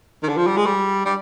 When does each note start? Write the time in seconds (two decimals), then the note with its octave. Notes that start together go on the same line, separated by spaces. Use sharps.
0.23 D#3
0.29 D3
0.37 F3
0.47 G3
0.57 G#3
0.66 G3
1.05 G3